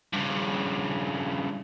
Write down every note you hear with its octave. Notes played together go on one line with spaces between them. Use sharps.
G2 C#3